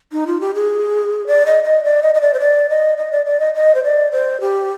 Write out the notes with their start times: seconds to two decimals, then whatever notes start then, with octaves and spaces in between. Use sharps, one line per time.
0.12 D#4
0.27 F4
0.41 G4
0.55 G#4
1.27 D5
1.46 D#5
1.64 D#5
1.84 D5
2.03 D#5
2.14 D#5
2.21 D5
2.34 C5
2.40 D5
2.69 D#5
2.97 D#5
3.12 D5
3.26 D5
3.40 D#5
3.54 D#5
3.75 C5
3.83 D5
4.11 C5
4.41 G4